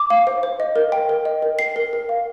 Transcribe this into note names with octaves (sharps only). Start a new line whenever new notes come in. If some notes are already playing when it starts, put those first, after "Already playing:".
Already playing: D6
F5
C5
C5
D#5
A#4
G5
A#4
D#5
A#4
G5 C7
A#4
A#4
F5